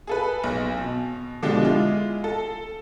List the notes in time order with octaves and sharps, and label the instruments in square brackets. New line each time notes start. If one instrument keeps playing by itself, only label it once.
[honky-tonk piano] G#4 A4 B4
B1
B2
B2 D3 F3 G#3 D4 G4
G#3 E4 F4
A4